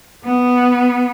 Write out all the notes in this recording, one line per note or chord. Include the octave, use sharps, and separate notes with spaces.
B3